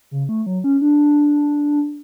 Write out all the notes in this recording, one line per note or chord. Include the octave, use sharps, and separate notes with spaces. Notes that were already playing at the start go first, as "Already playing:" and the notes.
C#3
A3
F#3
C#4
D4